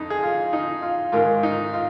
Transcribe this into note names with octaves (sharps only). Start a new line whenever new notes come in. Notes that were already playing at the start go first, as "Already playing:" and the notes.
Already playing: F2 D#4
G#4
F4
D#4
F4
G#2 D#3 F4
D#4
F4